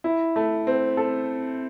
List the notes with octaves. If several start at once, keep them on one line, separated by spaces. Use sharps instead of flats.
E4
A3
C4
A4